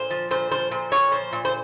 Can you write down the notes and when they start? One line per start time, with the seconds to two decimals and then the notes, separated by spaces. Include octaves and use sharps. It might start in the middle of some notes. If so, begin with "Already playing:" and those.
Already playing: A#2 C5
0.11 F3
0.31 A#2 C5
0.51 F3 C5
0.71 A#2 C5
0.92 A#2 C#5
1.12 F3 C5
1.33 A#2
1.45 C5